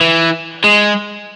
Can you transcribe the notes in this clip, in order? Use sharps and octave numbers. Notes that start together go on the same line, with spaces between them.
E3
G#3